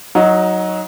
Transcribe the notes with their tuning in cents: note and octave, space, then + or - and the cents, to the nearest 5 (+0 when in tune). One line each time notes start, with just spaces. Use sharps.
F#3 +0 D#4 +10 F#4 -10